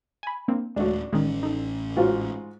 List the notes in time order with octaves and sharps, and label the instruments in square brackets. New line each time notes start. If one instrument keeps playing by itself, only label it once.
[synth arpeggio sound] G#5 B5
A#3 C4 D4
[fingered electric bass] D#1 [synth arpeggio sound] G#3 A3 [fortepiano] D4 F#4
[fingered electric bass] A1 C#4 [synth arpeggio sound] D#3 G#3
[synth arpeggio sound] D#4 A4
[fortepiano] G#2 F4 F#4